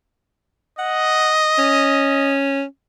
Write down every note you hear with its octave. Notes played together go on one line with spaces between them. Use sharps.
D#5 F#5
C#4